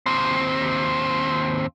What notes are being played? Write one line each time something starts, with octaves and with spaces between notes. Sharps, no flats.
D#2 C4